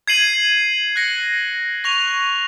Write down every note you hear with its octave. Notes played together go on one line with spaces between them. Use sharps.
G#6 C7 D#7 F#7
F#6 A#6 C#7
C#6 F#6 A#6 F7